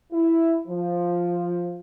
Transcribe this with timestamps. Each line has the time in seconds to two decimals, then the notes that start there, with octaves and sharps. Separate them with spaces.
0.11 E4
0.67 F3